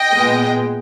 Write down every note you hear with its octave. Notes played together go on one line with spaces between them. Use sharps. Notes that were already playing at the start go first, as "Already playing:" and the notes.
Already playing: D#5 G5
A#2 G#3 B3